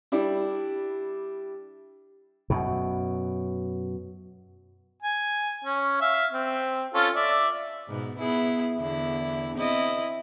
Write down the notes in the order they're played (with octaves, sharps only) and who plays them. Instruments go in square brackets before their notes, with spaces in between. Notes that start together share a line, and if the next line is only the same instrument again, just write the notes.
[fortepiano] G3 D4 E4
[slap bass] F#2 B2
[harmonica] G#5
C#4
E5 F5
C4
C#4 F4 A4
D5 E5
[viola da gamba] G#2 B2 B3
B3 E4 G#4
E2 D3 E4
C4 E4 D#5